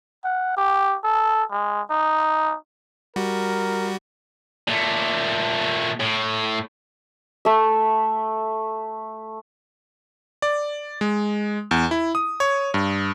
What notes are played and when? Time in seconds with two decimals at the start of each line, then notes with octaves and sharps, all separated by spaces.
0.24 F#5
0.57 G4
1.04 A4
1.51 G#3
1.90 D#4
3.16 G3 F#4 A#4
4.67 A#2 A3
6.00 A2
7.45 A3 E5
10.42 D5
11.01 G#3
11.71 E2
11.91 E4
12.15 D#6
12.40 C#5
12.74 G2